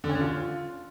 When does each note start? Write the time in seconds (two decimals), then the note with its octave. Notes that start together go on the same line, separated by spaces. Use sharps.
0.04 D3
0.09 C#4
0.15 D3
0.21 F4